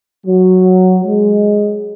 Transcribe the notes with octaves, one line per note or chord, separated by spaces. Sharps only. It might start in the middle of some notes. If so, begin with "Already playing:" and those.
F#3
G#3